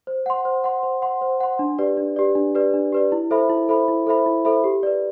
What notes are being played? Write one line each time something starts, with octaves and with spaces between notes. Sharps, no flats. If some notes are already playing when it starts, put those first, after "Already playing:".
C5
F#5 C6
C5
F#5 C6
C5
F#5 C6
C5
F#5 C6
D4
G4 B4 D5
D4
G4 B4 D5
D4
G4 B4 D5
D4
G4 B4 D5
E4
A4 C5 E5 B5
E4
A4 C5 E5 B5
E4
A4 C5 E5 B5
E4
A4 C5 E5 B5
G4
B4 D5